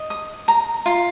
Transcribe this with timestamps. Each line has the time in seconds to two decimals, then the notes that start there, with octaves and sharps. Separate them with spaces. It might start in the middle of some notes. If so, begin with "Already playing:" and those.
Already playing: D#5
0.10 D#6
0.48 A#5
0.86 F4